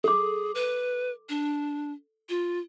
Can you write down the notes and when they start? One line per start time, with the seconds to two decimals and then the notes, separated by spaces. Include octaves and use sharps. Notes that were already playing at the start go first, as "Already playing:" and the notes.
0.04 G#4 A4 D6
0.55 B4
1.29 D4
2.29 F4